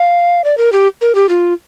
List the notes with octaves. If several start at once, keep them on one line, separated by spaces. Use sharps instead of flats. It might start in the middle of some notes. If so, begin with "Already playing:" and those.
Already playing: F5
D5
A#4
G4
A#4
G4
F4